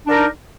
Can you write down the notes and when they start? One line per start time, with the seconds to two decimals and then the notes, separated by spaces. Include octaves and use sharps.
0.07 D4
0.10 A#4
0.14 D#4